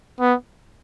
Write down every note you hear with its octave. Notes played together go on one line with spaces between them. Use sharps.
B3